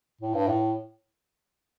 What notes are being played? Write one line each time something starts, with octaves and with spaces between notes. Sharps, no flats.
A2
G2
A2